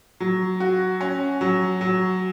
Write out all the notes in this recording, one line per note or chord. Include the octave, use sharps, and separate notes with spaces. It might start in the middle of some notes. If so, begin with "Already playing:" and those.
F#3
F#4
C#4
F#3
F#3